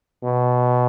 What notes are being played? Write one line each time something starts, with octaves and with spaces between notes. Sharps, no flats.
B2